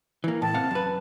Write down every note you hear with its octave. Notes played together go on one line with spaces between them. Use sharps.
E3 A#3
A2 A5
C3 F5 F#5
F#2 B4